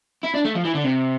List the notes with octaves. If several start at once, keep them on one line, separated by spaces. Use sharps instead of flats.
E4
D4
A3
F3
E3
D3
C3